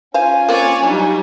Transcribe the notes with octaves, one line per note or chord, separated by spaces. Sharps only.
C#4 F4 C5 F5 G#5
A#3 C4 C#5 D5
F#3 G3 D4 D#4